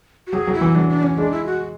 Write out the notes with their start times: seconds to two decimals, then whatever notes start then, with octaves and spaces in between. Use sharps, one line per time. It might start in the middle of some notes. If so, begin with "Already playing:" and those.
0.27 F#4
0.33 F#3 G#4
0.47 F#3
0.54 E4
0.61 E3
0.75 F#3 D4
0.90 D4
1.03 C#4
1.17 G#3 D4
1.32 E4
1.46 F#4